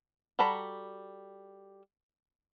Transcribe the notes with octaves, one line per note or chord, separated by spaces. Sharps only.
G3 F#4 A4 A#5 B5